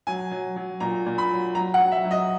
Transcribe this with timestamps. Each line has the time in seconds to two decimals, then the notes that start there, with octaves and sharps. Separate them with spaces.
0.07 F#3 G#5
0.31 F#3
0.56 F#3
0.80 A#2 A#5
1.06 A#2
1.18 B5
1.31 F#3
1.55 F#3 A#5
1.74 F#5
1.80 F#3
1.92 E5
2.05 F#3
2.11 D#5